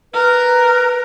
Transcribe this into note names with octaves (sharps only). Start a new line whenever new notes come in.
A#4 B4